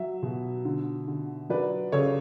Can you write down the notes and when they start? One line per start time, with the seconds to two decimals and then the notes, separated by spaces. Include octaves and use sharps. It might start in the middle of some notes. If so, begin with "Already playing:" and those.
Already playing: F#3 E5
0.23 B2
0.65 D3
1.08 D3
1.50 F#3 B4 D5
1.92 C#3 A4 C#5